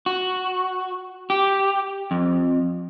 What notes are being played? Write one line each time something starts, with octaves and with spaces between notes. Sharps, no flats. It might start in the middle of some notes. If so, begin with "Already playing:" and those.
F#4
G4
F2